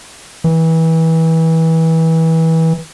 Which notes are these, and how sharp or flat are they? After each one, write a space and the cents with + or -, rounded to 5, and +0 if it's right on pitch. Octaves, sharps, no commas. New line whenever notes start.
E3 -25